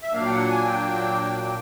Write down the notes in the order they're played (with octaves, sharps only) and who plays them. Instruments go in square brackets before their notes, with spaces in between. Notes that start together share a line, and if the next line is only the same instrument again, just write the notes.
[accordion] E5
A#2 F#3 A#3 D4 F5
G5
F#5
G#5
G5